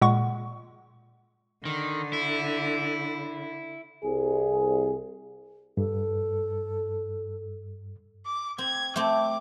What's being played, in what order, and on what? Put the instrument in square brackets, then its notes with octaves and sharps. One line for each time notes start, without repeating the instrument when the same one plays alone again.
[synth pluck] A#2 G#3 F#5 C#6
[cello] D3 [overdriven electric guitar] D#3
[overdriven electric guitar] E4
[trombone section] C2 G#4
[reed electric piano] G2 [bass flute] A4
[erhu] D6
[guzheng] C4 [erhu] G#6
[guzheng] A3 C4 [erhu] D6